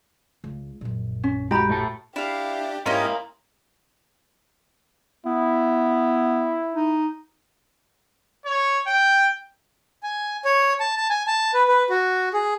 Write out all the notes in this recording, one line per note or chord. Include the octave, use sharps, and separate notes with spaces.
C#2
A#1 F#2
C#4
G#3 E4 F#4 G4 A#5 B5
A2 A3 A5
D4 E4 G4 F5
G#2 A#3 C#4 E4 G4 D#5 A#5 C6
B3 E4
D#4
C#5
G5
G#5
C#5
A5
A5
G#5
A5
B4
B4
F#4
G#4